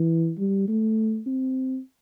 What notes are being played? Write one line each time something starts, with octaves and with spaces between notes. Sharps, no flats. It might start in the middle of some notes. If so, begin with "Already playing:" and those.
Already playing: E3
G3
A3
C4